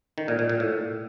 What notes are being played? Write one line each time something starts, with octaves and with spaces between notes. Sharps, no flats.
D#3
A#2
A#2
A#2
A2